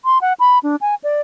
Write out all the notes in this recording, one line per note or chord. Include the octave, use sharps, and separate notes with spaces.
C6
F#5
B5
D4
G#5
D5